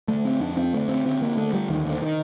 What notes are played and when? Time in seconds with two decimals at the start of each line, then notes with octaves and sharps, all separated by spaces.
0.08 D3 A3
0.25 C4
0.40 F2 D4
0.57 C4
0.73 D3 A3
0.89 C4
1.05 D3 C4
1.22 A#3
1.37 D3 A3
1.53 G3
1.69 D#2 D#3
1.85 D3
2.02 D#3